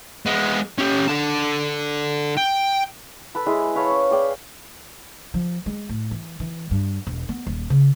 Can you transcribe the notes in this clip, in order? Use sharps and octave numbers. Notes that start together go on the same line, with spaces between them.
G#3 B3
C#4 G4
D3 A5
G5
A4 B4 B5
G#3 E4 G#4
B4 C#5 F5 A5
C#4
G#4 D5 G5
F3
G#3
A2
E3
E3
G2
E1
B3
D#1
C#3